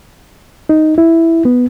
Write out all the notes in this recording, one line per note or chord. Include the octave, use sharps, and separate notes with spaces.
D#4
E4
B3